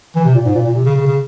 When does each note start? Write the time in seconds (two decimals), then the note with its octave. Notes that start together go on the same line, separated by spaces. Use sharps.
0.16 E3
0.24 C3
0.35 A#2
0.45 G#2
0.55 A#2
0.66 A#2
0.75 C3
0.85 C#3
0.96 C#3
1.06 C#3